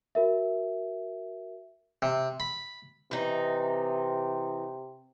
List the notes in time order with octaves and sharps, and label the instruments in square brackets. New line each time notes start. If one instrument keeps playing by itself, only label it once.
[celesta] F#4 A#4 E5
[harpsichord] C3
B5
[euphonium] C3 [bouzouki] E3 D#4